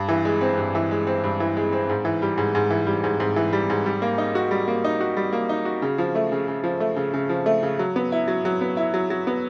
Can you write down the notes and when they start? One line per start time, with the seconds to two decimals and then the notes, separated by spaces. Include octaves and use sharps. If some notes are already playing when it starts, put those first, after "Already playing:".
Already playing: G2
0.09 E3
0.25 G#3
0.41 C4
0.57 G2
0.75 E3
0.91 G#3
1.07 C4
1.24 G2
1.40 E3
1.57 G#3
1.72 C4
1.89 G#2
2.05 E3
2.22 G3
2.38 G#2
2.55 G#2
2.70 E3
2.87 G3
3.04 G#2
3.20 G#2
3.36 E3
3.53 G3
3.70 G#2
3.86 G3
4.02 A#3
4.18 D#4
4.35 F#4
4.51 G3
4.68 A#3
4.84 D#4
5.01 F#4
5.17 G3
5.33 A#3
5.49 D#4
5.65 F#4
5.82 C#3
5.98 F3
6.15 A3
6.32 C#3
6.48 C#3
6.64 F3
6.80 A3
6.96 C#3
7.14 C#3
7.29 F3
7.46 A3
7.63 C#3
7.79 F#3
7.96 B3
8.12 E4
8.28 F#3
8.45 F#3
8.61 B3
8.77 E4
8.94 F#3
9.10 F#3
9.27 B3